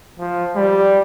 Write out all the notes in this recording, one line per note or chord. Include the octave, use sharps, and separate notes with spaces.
F3
G3